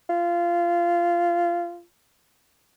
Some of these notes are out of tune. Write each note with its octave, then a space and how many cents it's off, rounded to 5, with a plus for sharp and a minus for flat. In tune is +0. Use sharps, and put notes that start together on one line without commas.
F4 -15